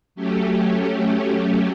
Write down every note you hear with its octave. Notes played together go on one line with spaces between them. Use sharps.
F#3 A3 C#4 G4